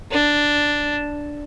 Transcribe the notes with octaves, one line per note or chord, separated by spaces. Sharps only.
D4